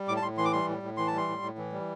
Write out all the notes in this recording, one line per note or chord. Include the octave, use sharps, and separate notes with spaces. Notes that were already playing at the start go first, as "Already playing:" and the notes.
Already playing: G3
A2 D6
A5
A2 C6
E3 C6
D6
G3 C6
A2
A2
E3 C6
A5
G3 C6
A2
A2
E3
G3